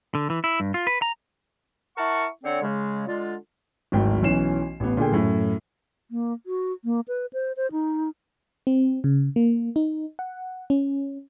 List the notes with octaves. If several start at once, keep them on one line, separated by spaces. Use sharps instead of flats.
D3
E3
E4
G2
F4
B4
A#5
E4 A#4 F#5 A5 C#6
D3 C4 C#5
C#3 G#3
D3 G#3 F4
D1 G#1 G5
B1 E3 C#4 C7 E7
A1 B3
A#2 D3 G#4 G5
F#2 A2
A#3
F#4
A#3
B4
C5
C5
D#4
C4
C#3
A#3
D#4
F#5
C#4